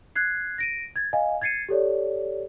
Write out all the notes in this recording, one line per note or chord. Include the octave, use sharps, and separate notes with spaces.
F#6 G#6 C7
A#6 D7 D#7
G#6 A6
D#5 F5 G#5
G#6 A6 C7 C#7 D#7
G4 A4 C#5 D5